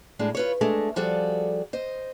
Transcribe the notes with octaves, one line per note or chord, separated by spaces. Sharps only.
A2 G#3 D4
F4 B4 C#5
G#3 A3 D4
F3 G3 F#4 G#4 A4 D5
C5 D#5